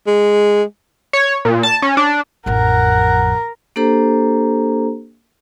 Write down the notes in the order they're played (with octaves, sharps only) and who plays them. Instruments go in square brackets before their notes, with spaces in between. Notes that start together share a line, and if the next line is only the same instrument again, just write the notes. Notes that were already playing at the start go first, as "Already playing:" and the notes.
[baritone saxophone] G#3
[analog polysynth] C#5
A#2
A5
C#4
D4
[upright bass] A1 F2 [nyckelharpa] A#4 A#5 [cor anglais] F#5
[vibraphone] A#3 D4 G4 A4 C5 A#5